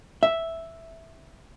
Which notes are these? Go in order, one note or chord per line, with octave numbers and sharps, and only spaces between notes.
E5